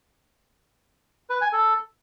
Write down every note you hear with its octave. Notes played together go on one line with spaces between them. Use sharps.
B4
G#5
A4